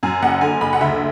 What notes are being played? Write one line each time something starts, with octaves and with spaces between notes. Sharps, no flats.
F#2 G#5
F#1 F#5
D3 G#5
F#1 B5
F#5
D2 E5